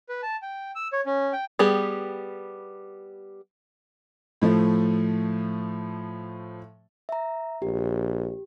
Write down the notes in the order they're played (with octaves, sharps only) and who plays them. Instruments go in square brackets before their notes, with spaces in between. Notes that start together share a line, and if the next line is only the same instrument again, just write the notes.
[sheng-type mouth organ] B4
A5
G5
E6
C#5
C#4
G5
[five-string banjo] G3 B3 G4 G#4
[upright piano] A2 F3 A3
[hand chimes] E5 A#5
[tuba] A#1 [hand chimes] G4